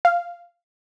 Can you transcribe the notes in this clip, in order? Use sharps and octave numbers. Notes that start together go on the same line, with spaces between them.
F5